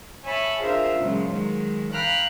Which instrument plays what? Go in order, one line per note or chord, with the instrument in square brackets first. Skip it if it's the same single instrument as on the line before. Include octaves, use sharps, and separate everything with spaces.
[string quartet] C#5 E5 G#5 A5 B5
D4 F4 G#4 A#4 C5 E5
A#2 C#3 F3 F#3 G#3
D#3 F#3 G#3
F5 G5 A#5 B5 F6 F#6